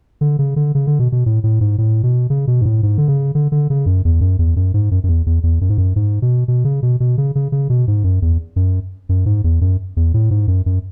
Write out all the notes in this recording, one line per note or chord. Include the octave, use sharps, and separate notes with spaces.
D3
C#3
D3
C#3
D3
B2
B2
A2
A2
G#2
A2
B2
C#3
B2
G#2
A2
G#2
D3
C#3
D3
D3
C#3
F#2
E2
F#2
E2
F#2
G#2
F#2
F#2
E2
E2
E2
F#2
G#2
F#2
G#2
B2
B2
C#3
B2
B2
C#3
C#3
C#3
B2
G#2
F#2
E2
F#2
F#2
G#2
E2
F#2
E2
A2
G#2
F#2
F#2